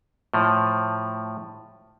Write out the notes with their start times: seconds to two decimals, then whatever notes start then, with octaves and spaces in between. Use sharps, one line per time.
0.34 A2 F3